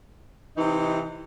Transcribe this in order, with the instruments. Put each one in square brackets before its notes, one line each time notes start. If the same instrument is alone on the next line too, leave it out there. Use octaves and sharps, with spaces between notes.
[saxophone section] C3 E3 D#4